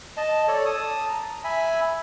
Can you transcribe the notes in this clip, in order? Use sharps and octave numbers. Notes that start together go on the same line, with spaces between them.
D#5 A5
A4 C#5 D5
A5 D#6
A#5
E5 G#5 B5